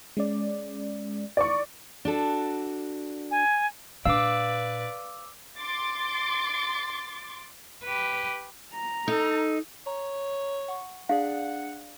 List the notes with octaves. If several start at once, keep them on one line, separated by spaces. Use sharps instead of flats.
G#3 C#4 D5
D5 C#6
D4 F#4 A4
G#5
A#2 D4 B4 D5 F5 D6 E6
C6 D6 A6
G4 B4
A#5
D#4 A4
C#5 A#5
F#5 C#6
D4 G#4 D5 F5 F#5